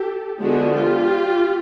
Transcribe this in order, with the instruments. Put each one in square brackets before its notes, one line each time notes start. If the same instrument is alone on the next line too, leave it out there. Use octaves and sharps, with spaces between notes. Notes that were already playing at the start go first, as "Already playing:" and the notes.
Already playing: [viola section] G4 A4
D3 F3 G#3 B3 D4 F#4 G#4
F4 G4